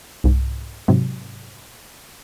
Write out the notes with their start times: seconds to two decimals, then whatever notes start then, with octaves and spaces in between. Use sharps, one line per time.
0.24 C2 G#2
0.88 G#2 C3 F#3